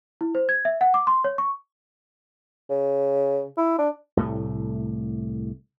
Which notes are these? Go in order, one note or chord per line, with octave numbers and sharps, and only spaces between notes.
E4
C5
G#6
E5
F#5
D6
C6
C#5
C#6
C#3
E4
D4
C2 A2 A3